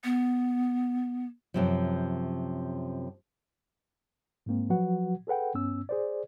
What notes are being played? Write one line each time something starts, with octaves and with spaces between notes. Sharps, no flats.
B3
F#2 C3 F3
G#2 G#3 A#3 C4
F3 F#3 F#4 B4 F#5
G#4 A4 B4 F#5 G5
G2 B3 C#4 E6
G#4 C5 D5